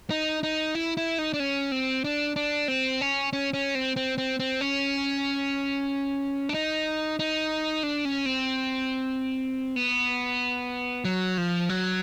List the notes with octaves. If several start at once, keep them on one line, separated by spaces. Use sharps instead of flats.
D#4
D#4
E4
E4
D#4
D4
C#4
C4
D4
D4
C4
C#4
C#4
C#4
C4
C4
C4
C4
C#4
D4
D#4
D#4
D4
C#4
C4
B3
F#3
F3
F#3